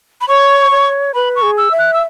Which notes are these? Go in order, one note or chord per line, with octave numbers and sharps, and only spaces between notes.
B5
C#5 C#6
C#5
B4 B5
C#6
G#4
E6
E5
F#6
E6